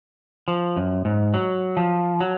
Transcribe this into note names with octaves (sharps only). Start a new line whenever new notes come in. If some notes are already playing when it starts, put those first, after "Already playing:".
F3
F#2
G#2
F#3
F3
F#3